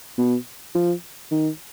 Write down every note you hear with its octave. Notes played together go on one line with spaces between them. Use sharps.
B2
F3
D#3